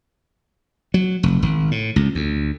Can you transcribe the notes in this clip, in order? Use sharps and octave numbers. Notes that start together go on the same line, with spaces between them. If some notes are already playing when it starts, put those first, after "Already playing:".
F#3
F1
G#1
A2
C#2
D2